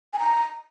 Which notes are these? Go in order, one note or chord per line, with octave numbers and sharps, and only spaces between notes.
G#5
A#5